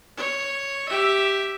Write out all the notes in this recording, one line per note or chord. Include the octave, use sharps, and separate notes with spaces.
C#5
G4 E5